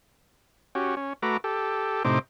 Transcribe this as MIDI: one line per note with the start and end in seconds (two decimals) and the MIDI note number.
0.75 0.95 61
0.75 0.95 66
0.75 0.95 67
0.97 1.13 61
1.22 1.37 57
1.22 1.37 66
1.22 1.37 71
1.22 1.37 82
1.22 1.37 86
1.44 2.03 67
1.44 2.03 69
2.05 2.19 45
2.05 2.19 48
2.05 2.19 63
2.05 2.19 72
2.05 2.19 86